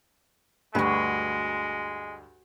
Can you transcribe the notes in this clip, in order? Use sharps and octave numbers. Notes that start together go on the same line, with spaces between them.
D2 G2 G#3 F#4 B4